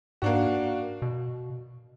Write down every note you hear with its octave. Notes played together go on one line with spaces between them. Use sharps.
G#2 A#3 D4 F#4
B2